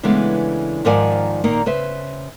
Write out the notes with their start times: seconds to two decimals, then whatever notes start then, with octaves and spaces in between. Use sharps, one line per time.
0.03 C#3 E3 G#3 A3 B3 D4
0.85 G#2 D#3 F3 A#4 D5 G#5
1.44 A#2 D#3 A#3 D#4
1.66 C#3 B4 C5 E5